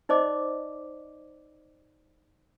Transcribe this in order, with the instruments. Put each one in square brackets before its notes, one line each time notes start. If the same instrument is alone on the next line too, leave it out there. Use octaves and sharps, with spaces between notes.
[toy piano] D#4 C5 D5 D#5 D6